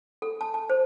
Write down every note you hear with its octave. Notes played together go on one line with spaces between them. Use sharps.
A4
A5
A5
C5